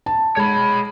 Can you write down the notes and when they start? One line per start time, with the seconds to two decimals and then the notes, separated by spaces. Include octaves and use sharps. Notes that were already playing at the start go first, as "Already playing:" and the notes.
0.06 A5
0.37 G#3 C#5 B5